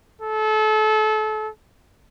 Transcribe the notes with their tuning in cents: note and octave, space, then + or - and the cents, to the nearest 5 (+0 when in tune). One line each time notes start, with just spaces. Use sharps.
A4 -30